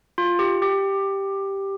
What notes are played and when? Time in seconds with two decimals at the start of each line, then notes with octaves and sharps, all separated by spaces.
0.18 F4
0.39 G4
0.62 G4